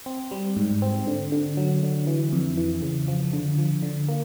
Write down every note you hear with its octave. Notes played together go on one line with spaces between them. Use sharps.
C4
G3
G#2
C4
D3
D3
F#3
D3
E3
F2
E3
C#3
F3
D3
F3
D3
A#3